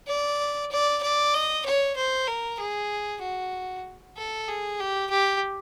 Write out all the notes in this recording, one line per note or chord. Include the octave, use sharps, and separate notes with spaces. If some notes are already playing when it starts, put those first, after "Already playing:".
D5
D5
D5
D#5
C#5
C5
A#4
G#4
F#4
A4
G#4
G4
G4